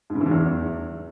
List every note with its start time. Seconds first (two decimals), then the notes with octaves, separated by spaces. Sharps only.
0.10 G#2
0.15 C#3
0.21 E3
0.26 G#2
0.31 E2